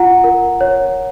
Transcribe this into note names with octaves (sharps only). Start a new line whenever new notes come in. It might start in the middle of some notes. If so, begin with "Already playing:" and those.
Already playing: F4 F#5 A#5
A#4
C#5